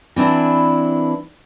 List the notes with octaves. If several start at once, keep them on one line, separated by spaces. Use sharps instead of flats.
E3 C4 D4 E4